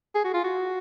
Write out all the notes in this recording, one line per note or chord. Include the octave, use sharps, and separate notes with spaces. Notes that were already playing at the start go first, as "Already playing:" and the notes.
G#4
F#4
F4
F#4